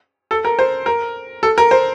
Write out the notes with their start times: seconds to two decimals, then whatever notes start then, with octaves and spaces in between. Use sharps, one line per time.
0.31 A4
0.45 A#4
0.59 C5
0.86 A#4
1.43 A4
1.58 A#4
1.71 C5